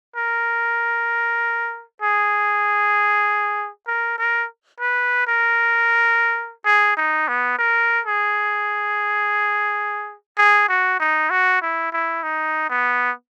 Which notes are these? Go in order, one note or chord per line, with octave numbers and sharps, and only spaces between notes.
A#4
G#4
A#4
A#4
B4
A#4
G#4
D#4
B3
A#4
G#4
G#4
F#4
D#4
F#4
E4
E4
D#4
B3